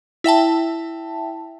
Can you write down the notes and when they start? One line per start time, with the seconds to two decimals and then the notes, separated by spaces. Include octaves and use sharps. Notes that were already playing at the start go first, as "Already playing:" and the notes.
0.24 E4 E5 G5 A5